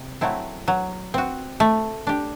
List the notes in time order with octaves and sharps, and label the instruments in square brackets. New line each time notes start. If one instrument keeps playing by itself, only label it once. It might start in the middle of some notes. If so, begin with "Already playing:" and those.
Already playing: [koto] C3
F#3 A3 C4 E4
F#3
C4 F#4
A3
D4 G4